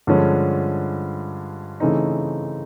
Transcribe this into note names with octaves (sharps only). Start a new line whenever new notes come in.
G2 D3 F3 G#3 C#4
C#3 E3 A3 C4 D#4